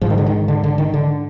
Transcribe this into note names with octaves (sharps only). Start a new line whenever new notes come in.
G#2 F3
D#3
D3
D#3
D3
D3
D#3
D3